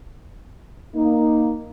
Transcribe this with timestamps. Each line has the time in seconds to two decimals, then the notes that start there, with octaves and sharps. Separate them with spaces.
0.95 A#3 D#4